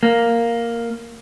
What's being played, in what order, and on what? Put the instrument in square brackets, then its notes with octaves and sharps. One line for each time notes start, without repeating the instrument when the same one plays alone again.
[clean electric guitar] A#3